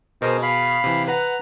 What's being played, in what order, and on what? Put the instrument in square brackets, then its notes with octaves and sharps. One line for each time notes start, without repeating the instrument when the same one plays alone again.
[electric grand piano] B2 G#4 [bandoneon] A#4 C5 D#5
[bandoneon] F5 B5
[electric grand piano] C3 E3
[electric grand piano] B4 F#5 [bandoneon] A#5